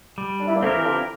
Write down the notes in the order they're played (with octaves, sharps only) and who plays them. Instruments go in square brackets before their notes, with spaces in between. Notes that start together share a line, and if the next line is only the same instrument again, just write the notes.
[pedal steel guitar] G3
[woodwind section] D4
E4
A#3 D4
[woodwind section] F3 A3 [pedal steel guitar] C4 E4 G4 A#4
[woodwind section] E3
D3 F3